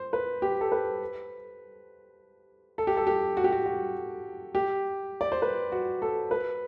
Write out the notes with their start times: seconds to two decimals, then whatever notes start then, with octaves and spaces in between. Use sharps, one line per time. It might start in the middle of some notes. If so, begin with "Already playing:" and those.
Already playing: C5
0.13 B4
0.42 G4
0.61 A4
0.72 B4
2.78 A4
2.87 G4
2.97 A4
3.07 G4
3.37 F#4
3.44 G4
3.52 F#4
3.66 F#4
4.55 G4
5.21 D5
5.32 C5
5.42 B4
5.72 F#4
6.02 A4
6.31 B4